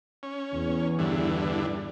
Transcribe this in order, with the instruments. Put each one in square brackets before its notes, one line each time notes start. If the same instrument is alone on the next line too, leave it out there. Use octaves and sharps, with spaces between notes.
[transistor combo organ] C#4
[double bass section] E2
[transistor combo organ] G2 D3 E3